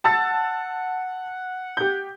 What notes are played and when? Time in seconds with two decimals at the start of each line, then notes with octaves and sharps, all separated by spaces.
0.04 F#5 A5 E6 A6
1.77 G4 G6